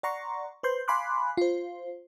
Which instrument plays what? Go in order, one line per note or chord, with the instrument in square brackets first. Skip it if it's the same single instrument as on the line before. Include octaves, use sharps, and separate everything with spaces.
[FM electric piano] D5 F#5 A#5 C6 C#6
B4 C5 C6 G6
F5 G#5 B5 C6 D6 F#6
F4 C5